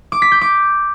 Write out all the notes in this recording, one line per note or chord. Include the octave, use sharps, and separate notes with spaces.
D6
B6
G6
D6